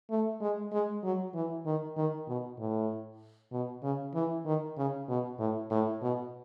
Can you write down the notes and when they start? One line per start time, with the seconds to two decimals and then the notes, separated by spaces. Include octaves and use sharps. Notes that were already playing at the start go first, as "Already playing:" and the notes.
0.10 A3
0.41 G#3
0.73 G#3
1.04 F#3
1.34 E3
1.66 D#3
1.97 D#3
2.28 B2
2.59 A2
3.52 B2
3.83 C#3
4.14 E3
4.46 D#3
4.77 C#3
5.09 B2
5.39 A2
5.71 A2
6.02 B2